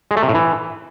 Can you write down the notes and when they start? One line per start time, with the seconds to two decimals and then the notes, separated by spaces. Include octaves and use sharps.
0.11 G#3
0.17 A3
0.23 C3
0.29 A2
0.35 E3